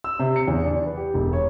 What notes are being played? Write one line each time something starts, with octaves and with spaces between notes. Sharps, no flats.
E6
C3
C#7
E2
D4
B4
G4
E1
C#5